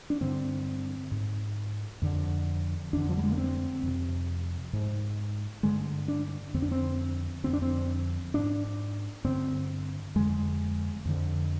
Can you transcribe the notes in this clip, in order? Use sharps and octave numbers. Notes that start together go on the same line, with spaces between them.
D4
G2 D3 C4
G#2
F2 D3
F2 D3 D4
F3
G3
G#3
A#3
C4
F2 C3
G#2
G2 D3 G#3
D4
F2 D3 C4
D4
C4
F2 D3 C4
D4
C4
G#2 D4
G2 D3 C4
F2 D3 G#3
F2 D3